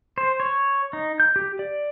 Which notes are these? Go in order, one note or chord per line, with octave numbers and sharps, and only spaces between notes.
C5
C#5
D#4
G6
G4
D5